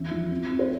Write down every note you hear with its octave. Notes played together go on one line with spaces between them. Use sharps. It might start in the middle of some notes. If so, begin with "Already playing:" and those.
Already playing: E2 C#4 E5
F3
C4
C4
C5